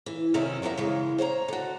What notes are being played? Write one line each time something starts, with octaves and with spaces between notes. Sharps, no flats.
E3
F#2 C3 D#3 C#4 E4
F3 F#3 E4 G4 A#4 E5
C#3 E3 G#3
C5 C#5 F#5 A#5
D3 F#4